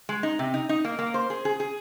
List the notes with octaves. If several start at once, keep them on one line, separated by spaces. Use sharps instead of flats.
G#3
D#4
C3
D#4
D#4
A#3
A#3
C5
G#4
G#4
G#4